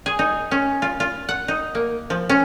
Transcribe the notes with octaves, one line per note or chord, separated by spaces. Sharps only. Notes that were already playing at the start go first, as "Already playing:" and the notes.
G#4
D#4
C#4
F4
F4
F#5
D#4
A#3
F3
C#4